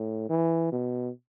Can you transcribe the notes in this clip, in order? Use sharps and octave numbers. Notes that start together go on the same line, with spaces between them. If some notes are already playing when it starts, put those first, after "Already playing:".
Already playing: A2
E3
B2